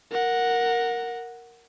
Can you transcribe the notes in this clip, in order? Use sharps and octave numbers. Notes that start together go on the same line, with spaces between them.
A#4 F#5